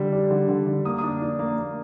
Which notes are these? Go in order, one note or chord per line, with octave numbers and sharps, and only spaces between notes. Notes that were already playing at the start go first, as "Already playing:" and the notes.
Already playing: D3 G3
D4
D3
D3
D3
A#3 D#6
D#6
D4
D4
A#3
A#3